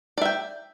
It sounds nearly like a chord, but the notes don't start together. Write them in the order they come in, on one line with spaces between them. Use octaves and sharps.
D5 E5 G5